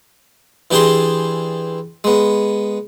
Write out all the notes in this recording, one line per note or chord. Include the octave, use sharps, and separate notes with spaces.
E3 D4 G4 G#4 A5 C6
G#3 B3